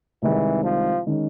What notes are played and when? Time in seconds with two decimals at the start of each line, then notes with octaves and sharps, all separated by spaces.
0.23 C2 C3 D#3 E3 G#3
0.64 F3
1.07 D#3 G#3 C#4